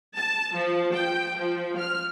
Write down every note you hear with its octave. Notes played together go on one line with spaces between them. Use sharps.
A5
F3
G5
F3
F6